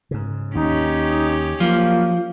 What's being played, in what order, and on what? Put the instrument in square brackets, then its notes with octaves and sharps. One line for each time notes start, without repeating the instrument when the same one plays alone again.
[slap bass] G#2 C#3
[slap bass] D#2 [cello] C#4 G4 [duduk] D#4
[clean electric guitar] F3 [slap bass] F#3 [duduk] A#3